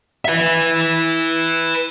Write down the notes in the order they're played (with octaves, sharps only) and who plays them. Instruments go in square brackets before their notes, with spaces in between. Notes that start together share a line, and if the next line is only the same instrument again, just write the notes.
[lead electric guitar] B4 E5